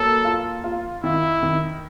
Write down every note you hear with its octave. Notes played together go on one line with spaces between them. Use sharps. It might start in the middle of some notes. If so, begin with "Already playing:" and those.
Already playing: F#3 A#3 A4
F4
F4
D#3 E4
D#3